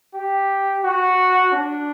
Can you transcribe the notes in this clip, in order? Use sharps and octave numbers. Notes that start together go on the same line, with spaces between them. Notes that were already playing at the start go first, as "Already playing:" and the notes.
G4
F#4
D4